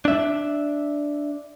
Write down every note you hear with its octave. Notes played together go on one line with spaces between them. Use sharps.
D4 E5